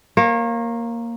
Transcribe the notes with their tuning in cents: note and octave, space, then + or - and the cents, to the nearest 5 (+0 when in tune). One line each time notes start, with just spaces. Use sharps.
A#3 +0 C#5 -35